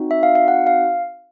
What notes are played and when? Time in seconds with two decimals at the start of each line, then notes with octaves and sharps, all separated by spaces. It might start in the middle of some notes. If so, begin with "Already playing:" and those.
Already playing: C4 D#4 F#4
0.11 E5
0.23 F5
0.35 F5
0.48 F#5
0.67 F5